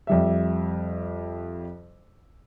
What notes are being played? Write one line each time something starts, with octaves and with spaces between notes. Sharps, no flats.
F2 G3 E5